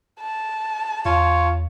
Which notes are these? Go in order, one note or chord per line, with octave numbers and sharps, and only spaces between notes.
A5
E2 F4 C#5